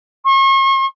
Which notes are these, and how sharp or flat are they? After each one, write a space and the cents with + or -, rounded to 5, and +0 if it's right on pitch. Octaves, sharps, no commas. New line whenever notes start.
C#6 -40